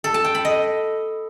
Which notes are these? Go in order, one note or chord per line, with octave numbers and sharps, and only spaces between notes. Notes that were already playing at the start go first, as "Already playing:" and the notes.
A4
A5
G5
B5
D#5